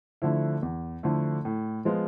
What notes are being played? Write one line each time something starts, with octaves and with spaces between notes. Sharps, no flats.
D3 F3 A3 E4
E2
D3 F3 A3 E4
A2
F3 G#3 B3 F4